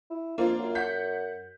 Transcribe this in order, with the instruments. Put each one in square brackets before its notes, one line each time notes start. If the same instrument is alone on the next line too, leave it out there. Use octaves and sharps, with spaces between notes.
[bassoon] E4
[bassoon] F2 [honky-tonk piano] A#3 D4 F4
[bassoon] F#2
[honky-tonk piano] F#5 G6 B6